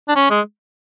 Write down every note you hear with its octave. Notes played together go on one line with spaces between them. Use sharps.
D4
C#4
G#3